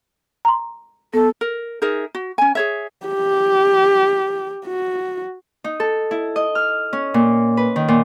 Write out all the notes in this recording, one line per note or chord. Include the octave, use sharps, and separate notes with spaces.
A#5 C6
B3 A4
A#4
D#4 G#4 A#4 E5
F#4
C#4 G#5
G#4 C#5 E5
G4
F#4
D#4
A4
E4
D#5
F6
C#4
A#2
B4
D#3
A#2